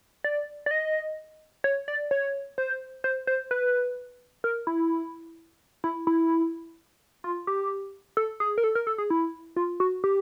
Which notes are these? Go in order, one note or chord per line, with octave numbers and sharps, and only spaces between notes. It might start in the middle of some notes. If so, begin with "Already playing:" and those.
D5
D5
D#5
C#5
D5
C#5
C5
C5
C5
B4
A#4
E4
E4
E4
F4
G4
A4
G#4
A#4
A4
A#4
A4
G#4
E4
F4
F#4
G4